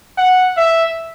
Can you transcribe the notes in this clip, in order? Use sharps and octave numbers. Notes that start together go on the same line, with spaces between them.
F#5
E5